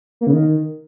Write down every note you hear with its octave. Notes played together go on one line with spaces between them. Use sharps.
A#3
C#3
D#3